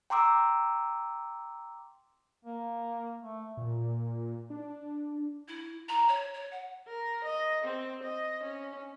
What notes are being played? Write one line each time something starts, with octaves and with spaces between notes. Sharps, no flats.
G5 A#5 C6 D6 E6
A#3
A3
A#2
D4
E4
A#5
C#5
C#5
F#5
A#4
D#5
C4
D#5
C#4